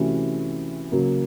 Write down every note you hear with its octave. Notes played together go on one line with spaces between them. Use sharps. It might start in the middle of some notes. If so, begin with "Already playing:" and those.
Already playing: C3 E3 A3 C#4 F#4
C#3 F#3 A#3